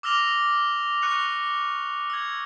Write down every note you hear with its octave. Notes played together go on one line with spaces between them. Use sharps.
D6 E6 F6 A#6 F7 G7
C#6 F#6 C#7 F7
E6 G#6